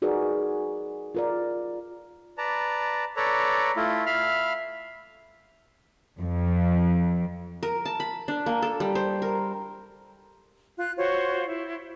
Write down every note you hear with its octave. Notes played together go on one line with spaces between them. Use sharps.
D#4 F#4 G#4 A#4 B4 D5
F4 A#4 D5
B4 D5 A5 A#5
A4 B4 C#5 D5 A#5
A3 E4 F4
E5 F5 B5 F6
F2
A#4
A5
B5
D4
A#3
A4
G3
C5
A#4
F4 F#6
F4 F#4 C5 C#5
E4